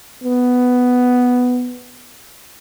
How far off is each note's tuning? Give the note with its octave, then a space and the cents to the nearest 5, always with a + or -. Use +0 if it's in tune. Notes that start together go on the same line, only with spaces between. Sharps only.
B3 +5